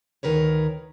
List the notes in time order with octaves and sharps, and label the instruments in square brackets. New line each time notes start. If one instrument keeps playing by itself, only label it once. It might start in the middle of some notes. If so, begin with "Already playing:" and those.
[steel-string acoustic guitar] D2 D#3 A#4 B4 C#5